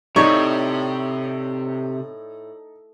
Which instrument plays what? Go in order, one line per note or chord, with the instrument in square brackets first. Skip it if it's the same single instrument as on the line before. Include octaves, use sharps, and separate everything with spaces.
[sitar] A2 [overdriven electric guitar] C3 [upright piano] D#4 D5 [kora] C#5